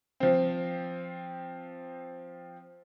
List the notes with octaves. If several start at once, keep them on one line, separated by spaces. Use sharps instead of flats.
F3 C4